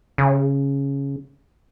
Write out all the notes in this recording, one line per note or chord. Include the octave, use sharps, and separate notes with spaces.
C#3